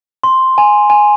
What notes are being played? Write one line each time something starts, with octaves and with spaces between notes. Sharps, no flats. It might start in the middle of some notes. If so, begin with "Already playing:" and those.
C6
G#5
G#5